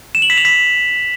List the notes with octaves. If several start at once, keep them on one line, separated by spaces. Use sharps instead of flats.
E7
F#7
B6
F7
B6